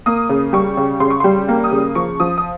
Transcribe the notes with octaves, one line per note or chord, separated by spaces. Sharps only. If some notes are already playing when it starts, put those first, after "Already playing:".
A#3 D#6
C#3
G3 C#6
C#3
C#3 C6
C#6
G3 C6
A#3
D#6
C#3
F3 C#6
F3 D#6
D#6